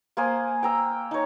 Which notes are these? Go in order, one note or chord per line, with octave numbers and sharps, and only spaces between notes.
A#3 C5 G#5 D#6
G5 A#5 E6
D#4 C#5